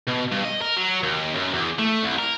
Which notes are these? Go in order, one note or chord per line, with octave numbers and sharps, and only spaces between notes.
B2
G2
D#5
A#4
F#3
D#2
F#2
E2
A3
C2
A#4